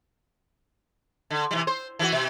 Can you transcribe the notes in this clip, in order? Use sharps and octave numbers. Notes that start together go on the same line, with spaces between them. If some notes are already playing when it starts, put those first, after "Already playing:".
D3
C3 E3 G3
C5
E3 F3 F#4
B2